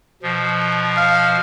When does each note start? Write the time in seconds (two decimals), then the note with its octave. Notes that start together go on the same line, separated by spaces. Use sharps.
0.23 B2 F3
0.97 F5